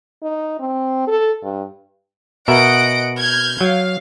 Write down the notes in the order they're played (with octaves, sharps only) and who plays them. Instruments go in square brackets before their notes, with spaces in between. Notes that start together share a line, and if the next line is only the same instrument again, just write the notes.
[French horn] D#4
C4
A4
G2
[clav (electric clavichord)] B2 A#4 E5 [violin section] D#5 F#5 D7
[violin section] F6 G6 G#6
[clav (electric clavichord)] F#3 [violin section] F5